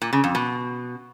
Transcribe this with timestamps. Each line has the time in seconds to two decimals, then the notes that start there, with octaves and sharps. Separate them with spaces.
0.02 A#2
0.13 C#3
0.24 F2
0.35 B2